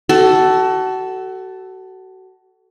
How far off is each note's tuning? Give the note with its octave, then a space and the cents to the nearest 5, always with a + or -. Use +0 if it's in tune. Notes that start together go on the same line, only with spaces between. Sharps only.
F#4 +30 A4 +0